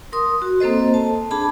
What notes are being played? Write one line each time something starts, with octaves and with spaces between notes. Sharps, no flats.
A#4 C6 D#6
F#4
A#3 C4 A4 C5 D#5
A5
D4 G#4 A5 B5